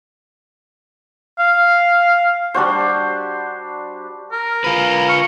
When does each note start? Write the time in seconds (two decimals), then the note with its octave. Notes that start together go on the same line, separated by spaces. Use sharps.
1.39 F5
2.54 G3 D4 F#4 C5
4.32 A#4
4.64 F4 B4
5.09 C#6